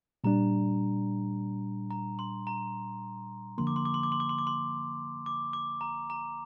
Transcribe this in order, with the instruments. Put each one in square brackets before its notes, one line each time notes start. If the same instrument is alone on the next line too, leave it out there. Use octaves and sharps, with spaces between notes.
[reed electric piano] A#2 G3 D4 [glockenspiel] A#5
[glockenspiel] A#5
C6
A#5
[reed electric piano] D3 F3 A#3 [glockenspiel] C6
[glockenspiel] D6
C6
D6
C6
D6
C6
D6
C6
D6
C6
D6
D6
A#5
A#5